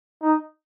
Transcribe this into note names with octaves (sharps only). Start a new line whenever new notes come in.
D#4